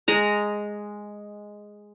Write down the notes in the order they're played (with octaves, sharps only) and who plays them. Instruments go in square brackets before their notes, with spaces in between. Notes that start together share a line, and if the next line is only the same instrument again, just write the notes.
[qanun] G#3 A#5